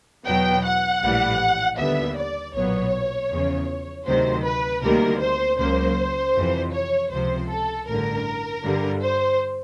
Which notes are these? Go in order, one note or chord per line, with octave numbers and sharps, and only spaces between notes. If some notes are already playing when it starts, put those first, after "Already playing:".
E2 B2 F#3 B3 G5
F#5
A#1 A2 E3 G3
D#2 D3 G3 B3 E5
D5
B1 A#2 F#3 B3 C#5
E2 C#3 F3
D2 C3 D#3 F#3 C5
B4
D2 C3 D#3 G3 A#3 A#4
C5
C#2 C#3 F#3 A#3 C5
F2 C3 E3
C#5
C#2 C3 F3 C5
A4
A1 G2 D3 A#4
G2 D3 G3
C5